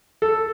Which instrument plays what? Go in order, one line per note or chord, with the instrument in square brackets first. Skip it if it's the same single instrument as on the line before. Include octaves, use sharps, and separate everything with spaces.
[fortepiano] A4